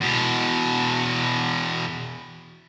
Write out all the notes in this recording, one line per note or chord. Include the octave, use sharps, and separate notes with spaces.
E2 B2